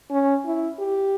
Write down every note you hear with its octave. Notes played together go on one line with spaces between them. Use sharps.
C#4
E4
G4